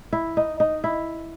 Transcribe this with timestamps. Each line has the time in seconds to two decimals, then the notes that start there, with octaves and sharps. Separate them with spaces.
0.13 E4
0.37 D#4
0.60 D#4
0.84 E4